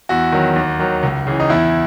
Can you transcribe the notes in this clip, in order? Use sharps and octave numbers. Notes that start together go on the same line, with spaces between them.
E2 F#4
D#3 F#3
D#2
D#3 F#3
C#2
C#3 E3
D#4
E2 E4